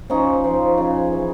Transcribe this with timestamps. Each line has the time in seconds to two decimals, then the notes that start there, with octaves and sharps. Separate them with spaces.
0.10 F3 C#4 D#4
0.44 F3
0.78 C#3
1.12 E3